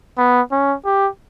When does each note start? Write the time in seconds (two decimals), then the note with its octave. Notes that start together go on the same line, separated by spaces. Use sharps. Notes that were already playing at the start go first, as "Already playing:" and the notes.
0.18 B3
0.52 C#4
0.85 G4